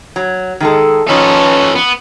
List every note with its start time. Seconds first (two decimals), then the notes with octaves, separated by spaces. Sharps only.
0.16 F#3
0.60 D#3 G#3 A4
1.09 D#3 F3 C#4 D#4 A4 B4
1.76 B3